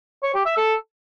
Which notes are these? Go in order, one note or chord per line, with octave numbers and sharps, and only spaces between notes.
C#5
G4
E5
A4